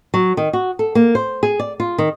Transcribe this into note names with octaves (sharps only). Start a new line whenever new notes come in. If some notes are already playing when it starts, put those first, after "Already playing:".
F#3
D#3
F#4
A4
A#3
C5
G#4
D5
F4
D#3